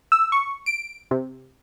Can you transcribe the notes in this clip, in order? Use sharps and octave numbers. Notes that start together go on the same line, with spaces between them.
E6
C#6
D7
C3